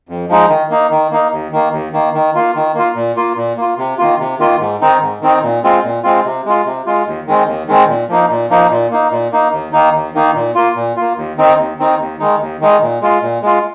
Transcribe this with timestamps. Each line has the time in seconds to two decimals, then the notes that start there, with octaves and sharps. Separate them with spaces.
0.09 F2
0.29 F3 G#3 D#4
0.49 D#3
0.70 A#3 D#4
0.91 D#3
1.11 A#3 D#4
1.32 D#2
1.52 D#3 A#3
1.72 D#2
1.93 D#3 A#3
2.14 D#3
2.35 A#3 F4
2.55 D#3
2.75 A#3 F4
2.96 A#2
3.16 A#3 F4
3.36 A#2
3.57 A#3 F4
3.78 C3
3.98 D#3 A#3 F4
4.19 C3
4.39 D#3 A#3 F4
4.60 G#2
4.81 D#3 C4 D#4
5.01 G#2
5.21 D#3 C4 D#4
5.43 A#2
5.63 G#3 C4 F4
5.83 A#2
6.03 G#3 C4 F4
6.25 C3
6.46 G#3 F4
6.65 C3
6.86 G#3 F4
7.06 D#2
7.27 D#3 G#3 C4
7.47 D#2
7.68 D#3 G#3 C4
7.88 A#2
8.09 F3 A#3 D#4
8.30 A#2
8.50 F3 A#3 D#4
8.71 A#2
8.91 A#3 D#4
9.11 A#2
9.32 A#3 D#4
9.52 D#2
9.73 D#3 A#3 D#4
9.94 D#2
10.15 D#3 A#3 D#4
10.35 A#2
10.55 A#3 F4
10.76 A#2
10.97 A#3 F4
11.17 D#2
11.38 D#3 C4 D#4
11.58 D#2
11.79 D#3 C4 D#4
12.00 D#2
12.19 D#3 G#3 D#4
12.40 D#2
12.61 D#3 G#3 D#4
12.82 A#2
13.02 G#3 F4
13.22 A#2
13.42 G#3 F4